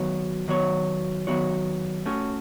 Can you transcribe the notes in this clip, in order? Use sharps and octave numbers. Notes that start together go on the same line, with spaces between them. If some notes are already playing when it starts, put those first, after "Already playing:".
Already playing: D#3 F#3 B3 F#4 C#5
D#3 F#3 B3 F#4 C#5
D#3 F#3 B3 F#4 C#5
A3 C#4 F#4 C#5